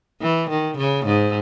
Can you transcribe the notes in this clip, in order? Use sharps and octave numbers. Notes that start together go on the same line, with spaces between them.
E3
D#3
C#3
G#2